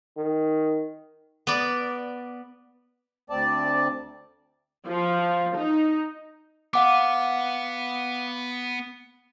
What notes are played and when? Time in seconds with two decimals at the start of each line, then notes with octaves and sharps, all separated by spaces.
0.17 D#3
1.47 B3 D5
3.30 D2 C4 D5 A5
4.87 F3
5.57 D#4
6.74 B3 F5 F#5 D6